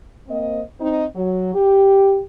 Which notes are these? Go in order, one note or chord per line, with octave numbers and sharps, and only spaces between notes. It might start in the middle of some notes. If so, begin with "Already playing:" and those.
A#3 C4 D#5
C4 D#4
F#3
G4